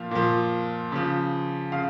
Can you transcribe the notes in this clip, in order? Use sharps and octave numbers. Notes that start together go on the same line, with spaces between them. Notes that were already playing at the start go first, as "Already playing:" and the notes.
Already playing: A#2 F3 F5
A#2 F3
C#3 F3
C#3 F5